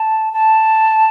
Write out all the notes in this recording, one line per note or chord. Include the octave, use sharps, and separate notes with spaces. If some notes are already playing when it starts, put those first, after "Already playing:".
Already playing: A5
A5